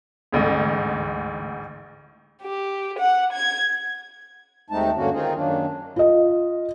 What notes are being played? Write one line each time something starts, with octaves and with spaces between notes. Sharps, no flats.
A1 D2 G#2
G4
F#5
G#6
D#2 G#3 A3 C4 D#4 A5
G2 D3 A#3 C#4 F#4
D#3 C4 D#4 F4 G#4
F#2 D#3 F#3 A#3 D4
F4 D#5